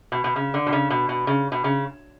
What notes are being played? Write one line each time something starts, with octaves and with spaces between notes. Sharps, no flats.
B2
B2
C#3
D3
B2
C#3
B2
B2
C#3
B2
C#3